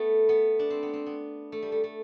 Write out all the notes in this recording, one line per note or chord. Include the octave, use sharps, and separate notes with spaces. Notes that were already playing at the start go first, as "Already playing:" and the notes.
Already playing: A3 B3
B3
D4
C4
B3
C4
B3
A3
G3
A3
A3